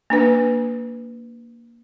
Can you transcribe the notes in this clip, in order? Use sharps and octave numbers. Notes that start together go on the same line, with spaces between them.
A#3 D4 B4